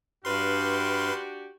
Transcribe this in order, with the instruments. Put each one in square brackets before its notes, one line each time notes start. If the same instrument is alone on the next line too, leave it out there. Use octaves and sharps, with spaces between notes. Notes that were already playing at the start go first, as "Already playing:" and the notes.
[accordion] G2 F6 [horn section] D4 F#4 G4 [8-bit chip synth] B4 C6